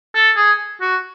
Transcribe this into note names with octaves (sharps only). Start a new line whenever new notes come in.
A4
G#4
F#4